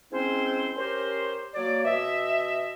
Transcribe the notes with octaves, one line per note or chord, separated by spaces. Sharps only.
G#3 C4 C#4 E4 C5
C#4 G4 A#4 C5
F#3 A#3 C#5 D5
B2 D#5 E5